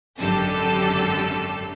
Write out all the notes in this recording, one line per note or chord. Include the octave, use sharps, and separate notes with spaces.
G#1 F#2 D3 G4 A4 E6